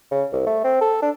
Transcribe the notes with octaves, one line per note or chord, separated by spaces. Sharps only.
C#3
C2
A3
C4
A4
D4